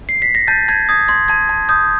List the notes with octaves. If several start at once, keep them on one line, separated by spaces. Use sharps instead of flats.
C7
B6
A#6
A5 G6 A6
A5 G#6
D#6 G#6
C6 G#6
A5 G#6
A5
D#6 G6